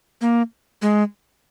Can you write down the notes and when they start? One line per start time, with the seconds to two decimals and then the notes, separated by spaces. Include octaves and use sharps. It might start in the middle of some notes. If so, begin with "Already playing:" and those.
0.21 A#3
0.82 G#3